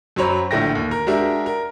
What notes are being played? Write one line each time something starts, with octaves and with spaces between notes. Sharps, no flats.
F#2 F#3 C5 C#5 A#5 B5
A#1 A2 D3 E5 G5 A#6
D#2
A#4
G#3 D4 F#4 G4 A#4 E5
A#4